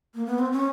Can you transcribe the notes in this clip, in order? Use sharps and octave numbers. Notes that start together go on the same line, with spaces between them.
A#3
B3
C4
C#4